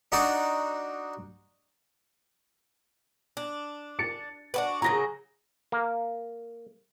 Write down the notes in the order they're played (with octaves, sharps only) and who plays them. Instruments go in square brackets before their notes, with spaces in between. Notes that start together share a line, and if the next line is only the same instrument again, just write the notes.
[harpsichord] D4 D#4 F#4 D5
[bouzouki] D4
[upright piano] A6 C#7
[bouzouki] D4 F#4 B4
[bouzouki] C#3 F#3 G#4 [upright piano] A#5 A#6
[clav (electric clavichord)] A#3